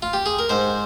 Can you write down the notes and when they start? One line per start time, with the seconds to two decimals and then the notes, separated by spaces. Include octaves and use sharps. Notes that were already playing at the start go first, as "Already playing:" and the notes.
0.02 F4
0.13 G4
0.26 G#4
0.39 A#4
0.49 G#2 C5